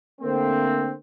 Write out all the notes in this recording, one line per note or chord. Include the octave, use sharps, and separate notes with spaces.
D3 A3 A#3 C4